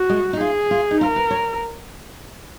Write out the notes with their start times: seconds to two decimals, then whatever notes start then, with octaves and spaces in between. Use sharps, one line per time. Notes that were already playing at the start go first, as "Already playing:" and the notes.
Already playing: F#4
0.09 G#3
0.33 D#4
0.40 F4 G#4
0.71 F4
0.91 D#4
1.01 F4 A#4
1.16 B4
1.30 C#5